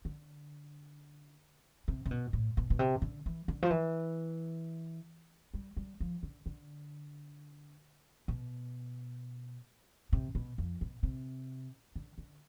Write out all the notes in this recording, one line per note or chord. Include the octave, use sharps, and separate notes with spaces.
D3
C3
C3
B2
A2
B2
B2
C3
D3
E3
D3
F3
E3
G3
G3
F3
D3
D3
B2
C3
B2
F2
B2
C3
D3
D3